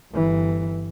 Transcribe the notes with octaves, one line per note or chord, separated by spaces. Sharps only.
G1 E3